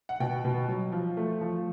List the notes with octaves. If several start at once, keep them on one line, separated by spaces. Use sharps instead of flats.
F#5
B2 G5
B2
F#3
F3
A3
F3